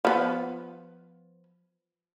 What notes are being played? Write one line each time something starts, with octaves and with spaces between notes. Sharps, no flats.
F3 B3